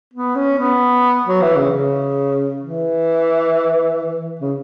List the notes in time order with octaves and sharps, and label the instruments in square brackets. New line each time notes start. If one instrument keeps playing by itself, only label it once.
[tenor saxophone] B3
C#4
B3
F#3
E3
C#3
C#3
E3
C#3